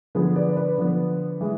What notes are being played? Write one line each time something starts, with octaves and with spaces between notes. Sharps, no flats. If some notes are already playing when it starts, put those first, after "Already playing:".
D3 F3 B3 G#4 B4
B4 D5
B4 D5
D3 F3 B3
E3 G#3